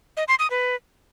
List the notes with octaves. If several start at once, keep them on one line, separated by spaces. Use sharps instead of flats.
D#5
C6
D#6
B4